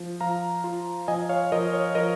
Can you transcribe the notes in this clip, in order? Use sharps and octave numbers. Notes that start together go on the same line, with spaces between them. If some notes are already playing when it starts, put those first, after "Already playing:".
Already playing: F3
F3 F5 A#5
F4
F3 D#5 G#5
C#5 F5
F3 A#4 D#5
C#5
F3 A#4 D#5